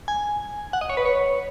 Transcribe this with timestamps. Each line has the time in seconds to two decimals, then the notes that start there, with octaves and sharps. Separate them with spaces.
0.08 G#5
0.73 F#5
0.81 D#5
0.90 C#5
0.97 B4
1.05 C#5